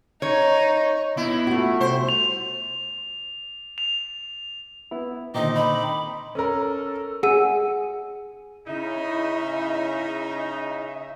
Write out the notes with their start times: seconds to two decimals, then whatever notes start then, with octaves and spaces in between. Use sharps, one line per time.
0.22 D#4 C#5
1.17 B3 E4 E5
1.47 A3 F4 F#4
1.80 C2 C5
2.09 F7
3.78 F7
4.91 B3 E4
5.35 A#2 D3 D#3 C4 D#4 D#5 D6
5.55 B5
6.35 C#4 A4 A#4
7.23 G#4 F#5 E6 D#7
8.67 C#3 D#4 E4 E5